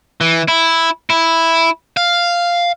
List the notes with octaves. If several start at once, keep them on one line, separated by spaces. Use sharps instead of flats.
E3
E4
E4
F5